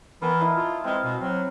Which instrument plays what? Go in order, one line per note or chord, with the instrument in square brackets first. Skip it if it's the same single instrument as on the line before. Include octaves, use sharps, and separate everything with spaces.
[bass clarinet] E3 [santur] B3 A#4 A5
[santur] D#4 E4 F5
[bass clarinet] F4
[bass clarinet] G#3 [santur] C4 B4 F5
[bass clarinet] B2
[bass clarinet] F#3 [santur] C4